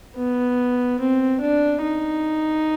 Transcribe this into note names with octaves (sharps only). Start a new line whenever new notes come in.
B3
C4
D4
D#4